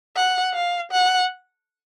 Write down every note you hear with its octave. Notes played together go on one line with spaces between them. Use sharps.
F#5
F5
F#5